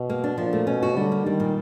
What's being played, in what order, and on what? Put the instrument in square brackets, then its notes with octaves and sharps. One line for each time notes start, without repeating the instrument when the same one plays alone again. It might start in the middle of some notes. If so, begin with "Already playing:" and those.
Already playing: [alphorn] B2
[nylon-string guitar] A#3
D4
[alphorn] A#2 [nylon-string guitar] F3
[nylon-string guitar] A3
[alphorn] B2 [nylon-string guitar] C#4
[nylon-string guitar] F#4
[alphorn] D3 [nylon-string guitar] G3
[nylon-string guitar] A#3
[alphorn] D#3 [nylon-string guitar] G3
[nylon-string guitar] A#2